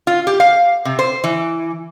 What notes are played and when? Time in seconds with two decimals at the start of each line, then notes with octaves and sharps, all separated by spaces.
0.07 F4
0.27 G4
0.40 F5
0.85 C3
0.99 C5
1.24 E3